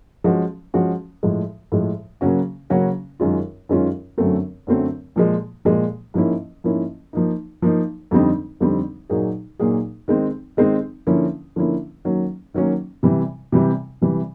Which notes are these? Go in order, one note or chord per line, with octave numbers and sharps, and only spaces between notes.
F3 G#3 C#4 F#4
F3 G#3 C#4 F#4
A2 F3 G#3
A2 F3 G#3
C#3 F#3 A#3 C#4 F#4
C#3 F#3 A#3 C#4 F#4
F#2 D#3 G#3 C#4 F4
F#2 D#3 G#3 C#4 F4
F#2 D3 F#3 A3 C4
F#2 D3 F#3 A3 C4
A#2 F3 G#3
A#2 F3 G#3
G#2 F3 A#3 C#4 E4
G#2 F3 A#3 C#4 E4
F3 A#3 D#4
F3 A#3 D#4
F2 D3 G3 C4 D#4
F2 D3 G3 C4 D#4
A#2 F#3 A#3 D#4 G#4
A#2 F#3 A#3 D#4 G#4
D#3 G#3 C4 D#4
D#3 G#3 C4 D#4
D3 F3 A#3 C#4 E4
D3 F3 A#3 C#4 E4
D#3 F#3 A#3 C#4
D#3 F#3 A#3 C#4
C3 E3 G3
C3 E3 G3
C3 E3 G3